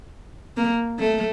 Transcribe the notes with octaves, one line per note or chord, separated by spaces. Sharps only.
A#3
A3